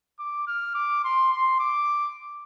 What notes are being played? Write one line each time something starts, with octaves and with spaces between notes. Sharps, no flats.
D6
F6
D6
C6
C6
D6